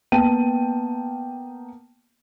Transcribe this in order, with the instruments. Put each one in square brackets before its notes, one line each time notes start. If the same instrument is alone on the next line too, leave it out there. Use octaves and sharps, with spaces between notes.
[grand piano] A#3 B3 G5 A5 D#7